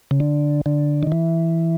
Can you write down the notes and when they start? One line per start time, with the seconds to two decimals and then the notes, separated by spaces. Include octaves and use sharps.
0.11 C#3
0.20 D3
0.66 D3
1.03 D#3
1.12 E3